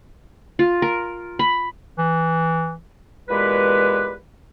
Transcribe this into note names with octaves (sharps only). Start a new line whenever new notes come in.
F4
A#4
B5
E3
E2 A#2 G#3 G4 B4